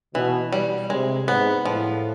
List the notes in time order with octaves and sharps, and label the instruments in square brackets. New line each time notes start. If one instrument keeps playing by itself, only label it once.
[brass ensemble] B2 [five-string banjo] E3
[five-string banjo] G3
[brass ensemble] C3 [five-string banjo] G#3
[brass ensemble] G#2 [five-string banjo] B3
[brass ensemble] A2 [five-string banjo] F3